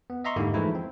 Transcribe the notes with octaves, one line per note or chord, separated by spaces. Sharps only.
B3
D#5 E5 A#5 C6 C#6
G#2 D3 A#3 D#4 E4 G4
E3 F3 G#3 A3 D#4 E4
C4